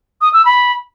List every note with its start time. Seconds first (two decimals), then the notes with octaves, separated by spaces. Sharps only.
0.21 D#6
0.33 E6
0.45 B5